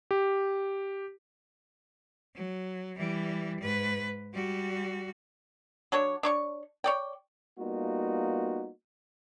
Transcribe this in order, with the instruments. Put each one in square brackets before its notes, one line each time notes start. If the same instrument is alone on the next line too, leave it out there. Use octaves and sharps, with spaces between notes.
[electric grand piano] G4
[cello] F#3
E3 G3
G#2 B4
G3 F#4
[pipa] F#3 D4 C#5
D4 C#5 C#6
C#5 D5 G5
[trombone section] G3 A#3 B3 D#4 F4 F#4